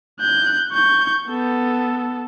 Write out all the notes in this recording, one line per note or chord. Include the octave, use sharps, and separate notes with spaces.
F#6 G6
C#6 G6
B3 A4